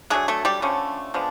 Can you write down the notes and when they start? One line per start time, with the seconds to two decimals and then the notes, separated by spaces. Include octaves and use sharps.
0.10 F#3 G#3 A3 D4 G#4
0.28 A3 A4
0.45 G3 G4
0.62 D3 F3 A3 C#4
1.14 F3 G#3 B3 D4